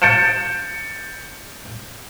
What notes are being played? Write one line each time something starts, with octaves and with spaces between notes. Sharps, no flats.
G6 A6 C#7 D7 E7